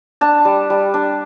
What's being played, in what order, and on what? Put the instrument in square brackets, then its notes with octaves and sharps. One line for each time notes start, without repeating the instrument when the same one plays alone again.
[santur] D4 A5
G3
G3
D4